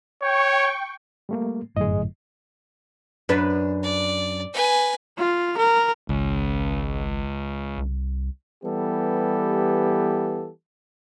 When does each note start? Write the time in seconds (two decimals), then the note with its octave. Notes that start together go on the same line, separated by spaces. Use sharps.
0.22 C#5 G5 C#6
1.29 G3 A3 A#3
1.77 G1 F#2 A2 G#4 D#5
3.29 F#2 D4 B4
3.83 D5
4.53 B4 G#5
5.18 F4
5.57 A#4
6.09 G#1 C#2
7.77 C2
8.64 E3 G3 B3 G4 A4